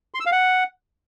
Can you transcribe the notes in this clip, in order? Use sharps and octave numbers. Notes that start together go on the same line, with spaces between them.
C6
E6
F5
F#5